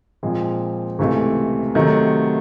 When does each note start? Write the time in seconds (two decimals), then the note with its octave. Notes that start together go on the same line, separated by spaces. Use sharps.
0.23 A#2 F3 G#3 C4
0.99 C#2 C3 E3 A3
1.75 C3 D#3 F#3 A3